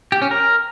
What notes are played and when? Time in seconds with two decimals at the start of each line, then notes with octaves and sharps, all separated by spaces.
0.12 G4
0.22 C#4
0.31 A#4